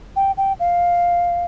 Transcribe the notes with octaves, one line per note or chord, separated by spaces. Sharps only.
G5
G5
F5